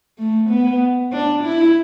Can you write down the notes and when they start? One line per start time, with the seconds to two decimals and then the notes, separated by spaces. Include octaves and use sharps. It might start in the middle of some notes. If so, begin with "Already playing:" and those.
0.18 A3
0.50 B3
1.13 D4
1.44 E4